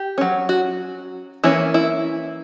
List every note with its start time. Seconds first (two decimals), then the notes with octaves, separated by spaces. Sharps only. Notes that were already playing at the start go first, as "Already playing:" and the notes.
Already playing: G4
0.18 F#3 C#4
0.49 F#4
1.44 E3 A#3 C#4 E4
1.74 E4